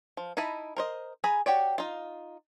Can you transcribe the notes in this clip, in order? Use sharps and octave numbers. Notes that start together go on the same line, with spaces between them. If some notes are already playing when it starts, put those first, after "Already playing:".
F3
D#4 E4 D#5 A5 B5
A#4 C5 D#5
G#4 G#5 A#5 B5
F#4 G4 C#5 D5
D#4 F4